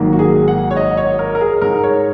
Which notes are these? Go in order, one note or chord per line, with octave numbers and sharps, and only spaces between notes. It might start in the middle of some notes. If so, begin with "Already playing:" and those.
Already playing: G#1 G#2 D#3 F#3 A#3
F#4
G#4
F#5
C#5
D#5
C#5
A#4
A#4
G#4
G#2 G#3 D#4 A#4
C#5